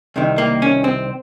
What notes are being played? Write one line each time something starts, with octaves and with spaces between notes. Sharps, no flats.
C2 C3 D#3
A#3
C#4
C4